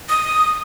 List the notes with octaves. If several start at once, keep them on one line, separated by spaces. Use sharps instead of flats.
D#6